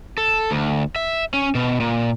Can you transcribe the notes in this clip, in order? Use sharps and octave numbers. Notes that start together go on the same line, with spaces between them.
A4
D2
E5
C#4
B2
A#2